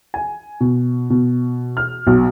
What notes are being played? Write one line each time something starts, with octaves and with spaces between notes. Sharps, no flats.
G#5
B2
B2
F6
B1